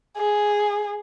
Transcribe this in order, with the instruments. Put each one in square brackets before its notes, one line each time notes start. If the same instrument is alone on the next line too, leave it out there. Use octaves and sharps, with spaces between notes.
[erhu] G#4